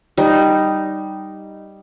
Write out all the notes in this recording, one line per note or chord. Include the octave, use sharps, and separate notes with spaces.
G3 D#4